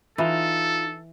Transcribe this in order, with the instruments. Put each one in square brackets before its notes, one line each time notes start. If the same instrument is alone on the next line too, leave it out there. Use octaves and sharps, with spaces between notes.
[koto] E3 [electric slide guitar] D#4 F4 [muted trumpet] A4